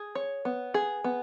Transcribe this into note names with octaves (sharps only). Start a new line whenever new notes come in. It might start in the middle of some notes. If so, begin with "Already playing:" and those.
Already playing: G#4
C#5
B3
G#4
B3